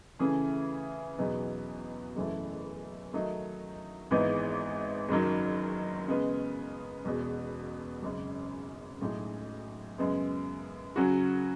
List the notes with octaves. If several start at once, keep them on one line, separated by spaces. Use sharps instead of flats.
C#3 E3 A3 C#4 G#4
E2 B2 F#3 B3 D#4
F#1 F#2 E3 A3
D#3 F#3 A3 D#4
G#1 G#2 E3 B3 D#4
F#1 F#2 D#3 F#3
C#3 G#3 B3
E1 E2 B2
G#1 F#2 C#3 G#3
B1 A2 G#3 D#4
F#2 C#3 G#3 B3
C#3 F#3 C#4 F#4